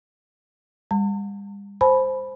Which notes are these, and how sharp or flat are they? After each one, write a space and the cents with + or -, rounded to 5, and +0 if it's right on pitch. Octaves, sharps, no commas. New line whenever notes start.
G3 +40 A5 +45
C5 +0 G#5 +45 B5 +0